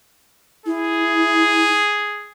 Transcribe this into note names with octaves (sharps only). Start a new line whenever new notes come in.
E4 G#4